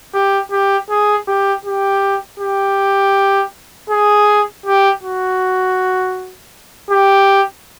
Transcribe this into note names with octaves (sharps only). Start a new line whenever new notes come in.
G4
G4
G#4
G4
G4
G4
G#4
G4
F#4
G4